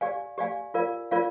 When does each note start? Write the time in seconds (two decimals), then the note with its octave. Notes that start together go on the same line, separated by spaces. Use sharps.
0.01 G4 D5 F5 G#5
0.38 G4 D5 F5 G#5
0.74 F4 A#4 D5 F5
1.11 F4 A#4 D5 F5